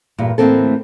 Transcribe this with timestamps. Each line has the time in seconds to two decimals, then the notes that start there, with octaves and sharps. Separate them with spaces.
0.18 E2 G2 A#2
0.38 D2 A2 E3 A#3 C4 A4